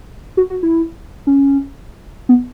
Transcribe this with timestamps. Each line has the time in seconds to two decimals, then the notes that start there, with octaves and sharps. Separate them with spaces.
0.37 F#4
0.50 F#4
0.63 E4
1.27 C#4
2.29 B3